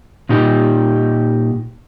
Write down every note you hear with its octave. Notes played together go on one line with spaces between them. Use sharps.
A#2 D#4 G4